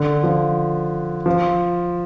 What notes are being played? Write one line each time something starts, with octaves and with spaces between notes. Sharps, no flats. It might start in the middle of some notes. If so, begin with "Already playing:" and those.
Already playing: D3
F3
F3